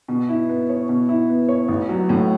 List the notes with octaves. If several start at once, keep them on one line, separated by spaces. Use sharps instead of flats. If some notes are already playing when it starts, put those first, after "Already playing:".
B2
E4
B3
C#5
B2
E4
B3
C#5
A1
F#3
A2